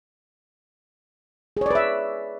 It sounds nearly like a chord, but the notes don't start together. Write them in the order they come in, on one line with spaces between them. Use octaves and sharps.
G#4 C#5 D5 B4 E5